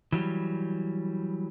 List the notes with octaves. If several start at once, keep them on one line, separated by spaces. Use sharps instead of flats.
E3 F#3 G3